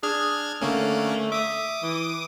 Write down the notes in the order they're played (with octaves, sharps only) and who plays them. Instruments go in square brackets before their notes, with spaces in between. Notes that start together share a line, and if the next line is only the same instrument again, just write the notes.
[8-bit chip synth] D4 F6 G#6 [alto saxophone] G#4
[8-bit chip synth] D3 A#3 C#4 [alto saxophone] A3
[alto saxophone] E5 [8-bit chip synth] D6 D#6
[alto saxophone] E3